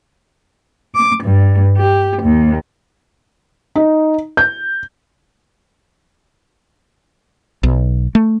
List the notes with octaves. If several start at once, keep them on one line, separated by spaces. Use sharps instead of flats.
D6
G2
G4
D#2
D#4
G6
B1
A3